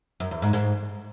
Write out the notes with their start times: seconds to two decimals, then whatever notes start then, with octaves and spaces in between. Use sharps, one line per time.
0.20 F#2
0.31 E2
0.42 G#2
0.53 G#2